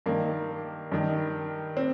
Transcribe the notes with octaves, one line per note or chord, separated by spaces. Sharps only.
G2 D#3 A#3
G2 D#3
C4